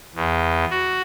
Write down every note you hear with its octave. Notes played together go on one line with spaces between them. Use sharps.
E2
F#4